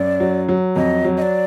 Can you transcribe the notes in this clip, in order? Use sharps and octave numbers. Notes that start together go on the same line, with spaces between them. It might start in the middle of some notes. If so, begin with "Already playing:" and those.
Already playing: F#2 D5
F#3
F#3
F2 D#5
F#3
D#5
D5